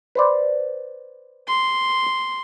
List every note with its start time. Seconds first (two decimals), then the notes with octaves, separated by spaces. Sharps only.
0.15 B4 C5 D5
1.48 C6